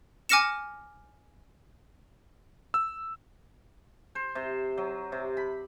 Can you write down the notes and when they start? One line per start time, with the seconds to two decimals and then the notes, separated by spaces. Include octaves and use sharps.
0.29 G#5 D6 F6 A#6 C#7 E7
2.74 E6
4.15 C5
4.35 C3
4.78 F#3
5.12 C3
5.37 B5